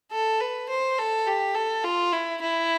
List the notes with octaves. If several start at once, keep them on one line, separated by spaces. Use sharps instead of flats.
A4
B4
C5
A4
G4
A4
F4
E4
E4